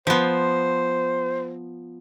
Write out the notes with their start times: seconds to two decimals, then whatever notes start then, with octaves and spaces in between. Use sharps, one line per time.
0.07 F3 B3 C5